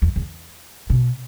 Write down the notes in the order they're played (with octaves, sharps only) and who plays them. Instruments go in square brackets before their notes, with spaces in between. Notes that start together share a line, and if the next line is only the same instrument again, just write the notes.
[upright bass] E2
E2
B2